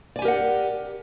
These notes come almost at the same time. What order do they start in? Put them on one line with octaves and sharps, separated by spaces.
D5 G#5 G4 A#4 F#5